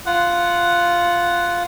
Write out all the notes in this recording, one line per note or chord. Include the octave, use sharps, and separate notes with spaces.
F4 F#5